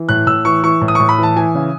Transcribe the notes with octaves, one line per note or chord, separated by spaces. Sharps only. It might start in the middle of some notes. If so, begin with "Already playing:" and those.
Already playing: E3
A2 F#6
A2 E6
E3 C#6
E3 C#6
A2
D#6
A2 C#6
B5
E3 A5
E3 G#5
C#3